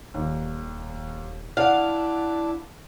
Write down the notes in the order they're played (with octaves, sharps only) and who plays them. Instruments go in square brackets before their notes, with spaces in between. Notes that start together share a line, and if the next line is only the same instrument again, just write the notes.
[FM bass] D#1 [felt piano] D#2
[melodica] D4 [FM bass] E4 [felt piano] D5 F#5 [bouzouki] F5